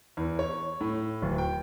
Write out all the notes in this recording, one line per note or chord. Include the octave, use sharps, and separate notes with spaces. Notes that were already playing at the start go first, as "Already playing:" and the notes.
E2
C#5
A2
D1
G5